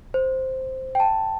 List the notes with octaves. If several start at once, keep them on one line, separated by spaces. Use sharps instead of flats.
C5
G5
A5